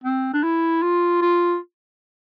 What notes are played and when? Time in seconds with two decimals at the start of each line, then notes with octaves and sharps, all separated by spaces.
0.04 C4
0.34 D4
0.43 E4
0.82 F4
1.22 F4